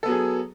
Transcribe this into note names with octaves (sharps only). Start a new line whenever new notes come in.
F#3 B3 G#4 A4